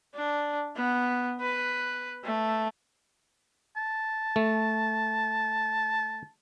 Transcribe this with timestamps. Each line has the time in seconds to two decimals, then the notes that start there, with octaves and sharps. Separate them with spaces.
0.15 D4
0.76 B3
1.41 B4
2.24 A3
3.77 A5
4.36 A3